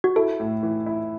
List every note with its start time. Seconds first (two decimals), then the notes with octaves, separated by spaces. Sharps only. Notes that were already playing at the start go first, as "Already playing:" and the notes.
0.04 F#4
0.16 E4 A4
0.40 A2
0.63 E3
0.86 E4